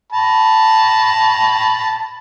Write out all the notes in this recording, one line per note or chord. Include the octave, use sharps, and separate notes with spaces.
A5 B5